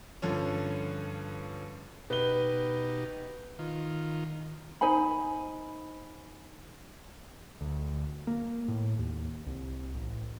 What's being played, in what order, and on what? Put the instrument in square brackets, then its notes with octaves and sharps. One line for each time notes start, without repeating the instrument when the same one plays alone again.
[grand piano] G2 D3 F3 C#4
[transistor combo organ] B2 D#4 G4 [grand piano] B4 G7
[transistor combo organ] D#3 F4
[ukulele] D#4 C5 G#5 B5
[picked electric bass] D2
A#3
A2
D#2
C2
A1